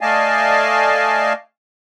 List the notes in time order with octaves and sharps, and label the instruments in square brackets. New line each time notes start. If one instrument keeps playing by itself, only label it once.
[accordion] A3 D5 D#5 F5 G#5 A5